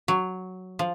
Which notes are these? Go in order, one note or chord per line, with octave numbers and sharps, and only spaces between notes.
F#3
F3